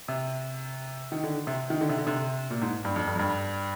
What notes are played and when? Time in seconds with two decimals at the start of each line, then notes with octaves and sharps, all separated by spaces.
0.08 C3
1.12 D#3
1.24 D3
1.47 C3
1.70 D#3
1.81 D3
1.89 C3
1.98 D3
2.07 C3
2.50 A#2
2.62 G#2
2.85 G2
2.96 F2
3.07 G2
3.15 F2
3.19 G2